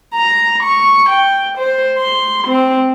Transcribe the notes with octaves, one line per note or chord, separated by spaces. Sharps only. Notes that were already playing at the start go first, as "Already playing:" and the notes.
A#5
C#6
G5
C5
C6
C4